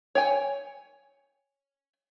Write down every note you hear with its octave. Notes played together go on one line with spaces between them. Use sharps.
C#5 G5 G#5